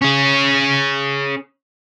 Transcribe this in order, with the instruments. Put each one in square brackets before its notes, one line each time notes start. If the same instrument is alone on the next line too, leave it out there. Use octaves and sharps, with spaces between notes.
[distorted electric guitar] C#4 G#4